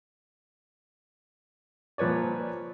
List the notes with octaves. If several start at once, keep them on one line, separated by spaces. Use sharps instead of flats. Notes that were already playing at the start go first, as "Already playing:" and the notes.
A#2 F3 B4 C#5 D5